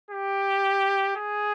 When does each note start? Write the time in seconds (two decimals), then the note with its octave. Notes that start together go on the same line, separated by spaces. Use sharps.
0.11 G4
1.16 G#4